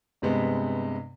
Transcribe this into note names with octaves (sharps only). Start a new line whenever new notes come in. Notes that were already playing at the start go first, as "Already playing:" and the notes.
G2 C3 G#3 B3